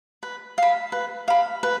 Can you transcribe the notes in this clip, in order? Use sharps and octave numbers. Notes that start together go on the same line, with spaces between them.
B4
F5 B5
B4
F5 B5
B4